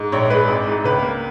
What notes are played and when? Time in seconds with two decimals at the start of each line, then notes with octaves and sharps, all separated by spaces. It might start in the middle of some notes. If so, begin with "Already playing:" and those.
Already playing: G#2
0.12 A#1 C#5
0.30 G#3 B4
0.48 G#1
0.67 G#2
0.84 C#2 B4
1.03 A#3